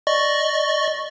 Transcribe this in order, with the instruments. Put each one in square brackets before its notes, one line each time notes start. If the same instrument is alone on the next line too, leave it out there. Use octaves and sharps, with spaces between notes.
[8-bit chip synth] D5 D#5 C#6